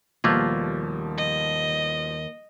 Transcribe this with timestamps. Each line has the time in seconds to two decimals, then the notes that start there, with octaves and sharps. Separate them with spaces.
0.24 D#2 B2 F3 G3 A3 A#3 F4
1.18 D#5